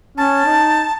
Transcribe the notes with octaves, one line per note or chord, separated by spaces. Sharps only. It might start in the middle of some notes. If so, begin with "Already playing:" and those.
C#4 A5
D#4